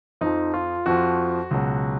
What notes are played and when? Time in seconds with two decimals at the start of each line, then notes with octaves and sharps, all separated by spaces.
0.21 F2 F3 D#4
0.54 F4
0.86 F2 F3 F#4
1.51 C#2 B2 F#3